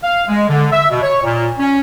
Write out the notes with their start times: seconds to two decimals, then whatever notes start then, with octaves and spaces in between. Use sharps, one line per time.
0.03 F5
0.28 G#3
0.49 D3
0.72 E5
0.91 B2
1.02 C#5
1.23 A#2
1.58 C#4